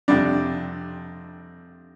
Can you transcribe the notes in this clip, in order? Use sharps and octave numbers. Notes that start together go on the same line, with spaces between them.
F2 C3 G3 D4